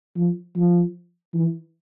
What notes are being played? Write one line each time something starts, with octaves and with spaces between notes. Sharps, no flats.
F3
F3
E3